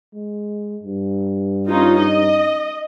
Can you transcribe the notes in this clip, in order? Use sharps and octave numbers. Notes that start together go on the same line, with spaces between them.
G#3
G2
C#4 D#4 F4
D#5